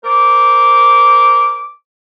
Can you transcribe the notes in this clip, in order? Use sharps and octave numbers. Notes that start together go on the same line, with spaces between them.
A#4 C5 D6